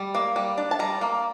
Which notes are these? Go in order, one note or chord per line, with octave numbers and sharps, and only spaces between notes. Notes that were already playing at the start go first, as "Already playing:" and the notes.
Already playing: G3
A#3
G3
D4
A5
G3 A#5
A#3